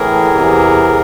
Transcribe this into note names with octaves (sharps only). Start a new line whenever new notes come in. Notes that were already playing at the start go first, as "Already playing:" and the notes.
Already playing: A2 E3 G#4 A#4
E2 C3 E3